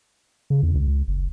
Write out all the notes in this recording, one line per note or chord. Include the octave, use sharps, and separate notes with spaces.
C#3
E2
C#2
C#2
F#1